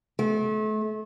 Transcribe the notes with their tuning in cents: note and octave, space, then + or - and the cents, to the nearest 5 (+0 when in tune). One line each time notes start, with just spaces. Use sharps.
A3 -35